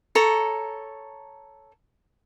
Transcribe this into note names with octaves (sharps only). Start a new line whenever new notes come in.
A4 C#5 A#5